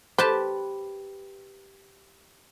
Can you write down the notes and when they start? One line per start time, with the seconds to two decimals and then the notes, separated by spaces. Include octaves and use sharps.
0.18 G4 B4 C5 A5